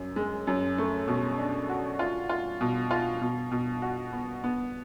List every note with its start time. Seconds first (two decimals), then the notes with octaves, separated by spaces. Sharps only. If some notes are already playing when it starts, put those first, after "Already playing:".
Already playing: F#2
0.16 G#3
0.47 F#2
0.78 A3
1.08 B2
1.38 D4
1.69 F#4
1.99 F4
2.29 F4
2.61 B2
2.91 F4
3.22 B2
3.52 B2
3.82 F#4
4.13 B3
4.44 B3